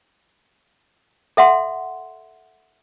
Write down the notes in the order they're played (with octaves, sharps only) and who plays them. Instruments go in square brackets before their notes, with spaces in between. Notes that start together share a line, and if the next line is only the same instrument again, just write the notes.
[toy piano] A4 E5 F#5 C6